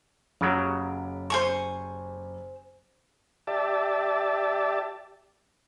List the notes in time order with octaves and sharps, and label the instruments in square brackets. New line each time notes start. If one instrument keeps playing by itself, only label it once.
[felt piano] F#1 G4 D7 [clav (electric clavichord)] C#3 F#3
[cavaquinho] C5 G#5 C#6
[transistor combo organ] G4 D5 E5 A5